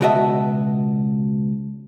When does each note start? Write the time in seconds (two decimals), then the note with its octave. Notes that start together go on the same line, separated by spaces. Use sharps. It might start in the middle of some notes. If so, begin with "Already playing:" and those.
0.01 C#2 B2 F#4 D#5 E5 A5